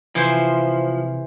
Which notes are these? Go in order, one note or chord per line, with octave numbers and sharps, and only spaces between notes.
C3 E3 F3 C5